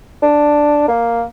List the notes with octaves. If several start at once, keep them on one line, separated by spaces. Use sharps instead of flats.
D4
A#3